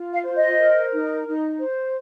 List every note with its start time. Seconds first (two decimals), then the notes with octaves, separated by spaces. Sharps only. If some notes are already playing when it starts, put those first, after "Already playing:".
Already playing: F4
0.12 F5
0.23 C5
0.36 D#5
0.58 A#4
0.92 D#4
1.26 D#4
1.60 C5